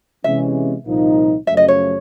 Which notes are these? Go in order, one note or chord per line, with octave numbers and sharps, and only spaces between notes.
C3 E3 G#3 C#4 E5
C2 A#2 F3 A#3 D#4
F#2 C#3 F3 A3 C#4 E5
D#5
C#5